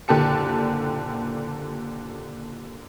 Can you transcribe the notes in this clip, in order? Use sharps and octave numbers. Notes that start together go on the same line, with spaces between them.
F#1 A#2 D3 G4 A5 C#7